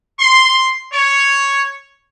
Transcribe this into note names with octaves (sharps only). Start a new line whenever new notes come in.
C6
C#5